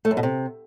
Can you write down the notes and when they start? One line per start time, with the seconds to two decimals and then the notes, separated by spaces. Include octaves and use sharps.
0.05 A3
0.11 F#2
0.17 B2
0.23 C3